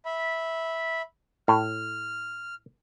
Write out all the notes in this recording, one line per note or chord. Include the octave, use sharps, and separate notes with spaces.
E5 B5
A2 F6